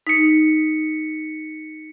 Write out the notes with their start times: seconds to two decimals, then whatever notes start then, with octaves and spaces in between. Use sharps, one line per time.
0.07 D#4 B6 C#7